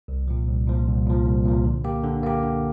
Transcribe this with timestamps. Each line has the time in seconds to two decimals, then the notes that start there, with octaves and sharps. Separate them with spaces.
0.08 C2
0.28 A#2 F3
0.47 C2
0.67 A#2 F3
0.87 C2
1.06 A#2 F3
1.26 C2
1.45 A#2 F3
1.65 D3
1.84 A#3 G4
2.04 D3
2.23 A#3 G4
2.43 D3